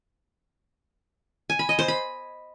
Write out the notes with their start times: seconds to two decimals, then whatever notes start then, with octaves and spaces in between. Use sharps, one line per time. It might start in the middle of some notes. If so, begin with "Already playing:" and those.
1.50 G#5
1.59 B5
1.69 D#5
1.79 C5
1.88 B5